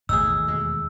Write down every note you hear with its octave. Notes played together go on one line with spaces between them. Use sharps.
A1 D#2 B2 D#3 A3 D#4 G#4 E6
E2 B2 G#3